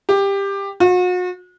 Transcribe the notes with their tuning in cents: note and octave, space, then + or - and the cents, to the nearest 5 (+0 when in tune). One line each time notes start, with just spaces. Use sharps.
G4 +15
F#4 -40